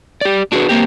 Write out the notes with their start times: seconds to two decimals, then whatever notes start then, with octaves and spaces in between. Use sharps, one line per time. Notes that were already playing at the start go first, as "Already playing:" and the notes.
0.21 G4 D5
0.52 D4 F#4 G#4 A#4 B4
0.69 A#3 C4 G4